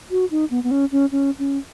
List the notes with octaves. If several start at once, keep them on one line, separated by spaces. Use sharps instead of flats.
F#4
D#4
B3
B3
C#4
C#4
C#4
C#4